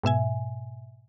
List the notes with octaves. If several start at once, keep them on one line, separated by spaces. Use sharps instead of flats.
G#2 B2 E5 G#5